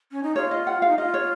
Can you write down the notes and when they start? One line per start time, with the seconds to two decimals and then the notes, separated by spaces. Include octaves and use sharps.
0.12 C#4
0.23 D#4
0.36 F4 C#5
0.51 D#5
0.67 F#5
0.82 F5
0.88 D#4
0.98 F4 D#5
1.14 C#5